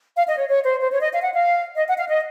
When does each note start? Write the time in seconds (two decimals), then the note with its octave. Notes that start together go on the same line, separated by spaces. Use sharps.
0.16 F5
0.28 D#5
0.38 C#5
0.48 C#5
0.64 C5
0.81 C5
0.91 C#5
1.01 D#5
1.12 F5
1.22 F#5
1.33 F5
1.76 D#5
1.87 F#5
1.97 F5
2.08 D#5